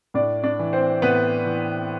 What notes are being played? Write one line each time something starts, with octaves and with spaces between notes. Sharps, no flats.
A2 D4 D5
D4 D5
E3
C4 C5
A2 B3 B4
E3